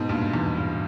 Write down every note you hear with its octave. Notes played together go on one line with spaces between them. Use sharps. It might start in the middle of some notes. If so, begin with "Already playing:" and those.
Already playing: G#2 B2
G2 A#2
E2 G#2
G2